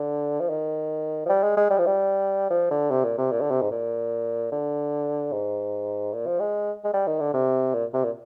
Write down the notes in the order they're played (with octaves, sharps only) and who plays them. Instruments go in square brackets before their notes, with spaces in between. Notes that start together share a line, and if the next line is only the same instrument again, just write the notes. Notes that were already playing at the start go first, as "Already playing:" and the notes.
Already playing: [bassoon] D3
F3
D#3
F3
G3
G#3
G#3
G3
F3
G3
F3
D3
C3
A#2
C3
A#2
D3
C3
G#2
A#2
D3
G#2
A#2
F3
G#3
G#3
G3
D#3
D3
C3
A#2
C3
A#2